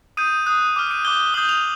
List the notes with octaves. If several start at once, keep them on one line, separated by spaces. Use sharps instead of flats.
D#6 G6 D#7
D#6 F#6
D6 F6
D#7
D6 G6 G7
D#6 G6 F#7
F7